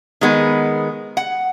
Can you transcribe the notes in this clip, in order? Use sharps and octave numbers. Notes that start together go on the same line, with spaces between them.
D#3 G#3 B3
F#5